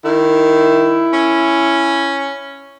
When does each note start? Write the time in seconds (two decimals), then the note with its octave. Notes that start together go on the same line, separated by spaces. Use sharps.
0.05 D#3 E4
1.14 C#4